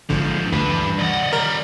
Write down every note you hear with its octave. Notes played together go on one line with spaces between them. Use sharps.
G#1 G#2 D3 F3
D2 G2 D4 B4
E3
C2 D5 D#5 F#5
D#3 G3 A#4